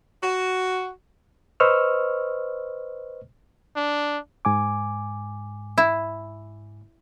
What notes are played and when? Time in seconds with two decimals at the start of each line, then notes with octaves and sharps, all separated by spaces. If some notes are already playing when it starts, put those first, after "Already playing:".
0.23 F#4
1.60 B4 C5 D#5 C#6 E6 F6
3.76 D4
4.45 G#2 G#5 D6
5.78 E4